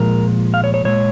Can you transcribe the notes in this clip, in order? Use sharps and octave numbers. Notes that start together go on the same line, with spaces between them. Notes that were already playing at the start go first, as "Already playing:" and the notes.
Already playing: A#2 F3 G#3 A#4
F5
C#5
C#5
A#2 G#3 C#5